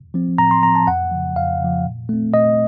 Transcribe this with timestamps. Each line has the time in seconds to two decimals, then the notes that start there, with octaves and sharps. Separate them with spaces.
0.14 F3 C4
0.38 A2 A#5
0.51 C6
0.63 F3 C4 A#5
0.75 A5
0.87 F2 F#5
1.11 C#3 F3
1.36 F2 F5
1.60 C#3 F3
1.85 A#2
2.09 A3 C4
2.33 A#2 D#5